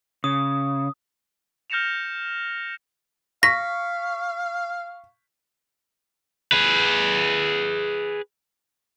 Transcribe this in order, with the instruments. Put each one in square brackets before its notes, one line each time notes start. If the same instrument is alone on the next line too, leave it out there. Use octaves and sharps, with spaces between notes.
[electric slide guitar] C#3 [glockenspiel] D#6
[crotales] F6 G6 A#6 C#7 E7 F7
[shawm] F5 [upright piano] C#6 B6 [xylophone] A#6
[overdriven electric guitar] G#4 B4